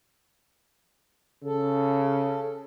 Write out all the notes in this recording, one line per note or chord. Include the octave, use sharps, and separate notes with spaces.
C#3 A4